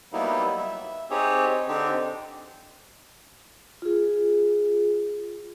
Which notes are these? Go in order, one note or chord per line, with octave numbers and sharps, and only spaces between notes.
F#3 G3 A#3 B3 D#4 E4
E5
C4 D#4 G4 G#4 C#5
D3 C4 D4 D#4 G4
F4 G#4